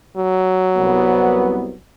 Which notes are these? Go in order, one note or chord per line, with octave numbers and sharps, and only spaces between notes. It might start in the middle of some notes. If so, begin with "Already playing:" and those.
F#3
C2 B3